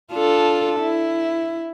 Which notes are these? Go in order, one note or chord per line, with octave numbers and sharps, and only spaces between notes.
D4 F4 A4
E4